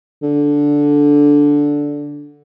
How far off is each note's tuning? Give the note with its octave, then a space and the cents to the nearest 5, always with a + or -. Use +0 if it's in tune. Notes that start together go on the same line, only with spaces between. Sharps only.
D3 -10